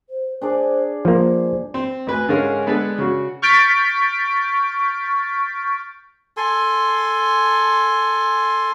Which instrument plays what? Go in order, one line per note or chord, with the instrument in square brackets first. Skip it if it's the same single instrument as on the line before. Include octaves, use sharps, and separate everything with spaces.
[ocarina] C5
[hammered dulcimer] D4 G#4 D5 [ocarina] C5
[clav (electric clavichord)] F3 A#3 [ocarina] C5
[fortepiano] C4
D2 B4 G#5
G#2 D3 G#3 C#4 A#4 F5
G#3 B3 D4 G#4 A4 B4
C#3 F#4
[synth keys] C#6 F6 G6 A6 B6 D7
[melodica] A4 G#5 C6